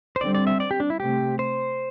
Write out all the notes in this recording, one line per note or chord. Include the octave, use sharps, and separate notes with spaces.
C5
D3 G3 C4 D5
D5
E5
D5
G4
D4
E4
C3 A3 C4 G4
C5